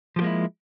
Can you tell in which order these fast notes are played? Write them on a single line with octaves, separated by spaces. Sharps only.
F3 G4 A#3 G#3 E4